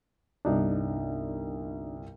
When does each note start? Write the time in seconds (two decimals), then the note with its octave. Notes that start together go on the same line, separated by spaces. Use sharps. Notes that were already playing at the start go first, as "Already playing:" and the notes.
0.45 G1 C2 D4 D#4